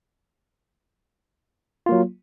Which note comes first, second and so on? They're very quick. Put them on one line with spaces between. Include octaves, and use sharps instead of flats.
F4 A#3 F#3